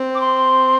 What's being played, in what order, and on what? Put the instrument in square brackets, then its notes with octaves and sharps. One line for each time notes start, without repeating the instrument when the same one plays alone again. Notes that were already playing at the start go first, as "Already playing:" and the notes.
Already playing: [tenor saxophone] C4
[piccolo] D6
C6